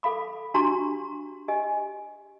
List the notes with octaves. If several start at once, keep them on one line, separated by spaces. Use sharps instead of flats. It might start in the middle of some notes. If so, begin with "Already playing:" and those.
A4 F5 B5 D6
D4 F#4 G4 A#5 C6 C#6
G4 D#5 G#5